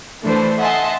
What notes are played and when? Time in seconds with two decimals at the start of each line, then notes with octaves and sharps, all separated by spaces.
0.23 E3 A3 D4 A4 B4 C5
0.58 D#5 E5 F#5 G#5 A5 C6